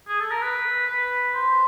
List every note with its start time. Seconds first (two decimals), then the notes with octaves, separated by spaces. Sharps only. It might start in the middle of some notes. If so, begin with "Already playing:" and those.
0.09 G#4
0.20 A4
0.31 A#4
0.42 B4
0.88 B4
1.34 C5